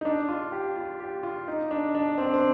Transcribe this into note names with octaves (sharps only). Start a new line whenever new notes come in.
D#4
D4
F4
G4
F4
G4
F4
D#4
D4
D4
C4
D4
C4